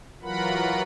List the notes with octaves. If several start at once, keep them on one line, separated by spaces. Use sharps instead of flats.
E3 F#3 F4 A#4 F#5 B5